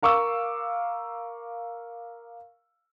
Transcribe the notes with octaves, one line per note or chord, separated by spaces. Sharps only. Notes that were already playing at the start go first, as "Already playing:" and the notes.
A#4 F5 C#6 D6 E6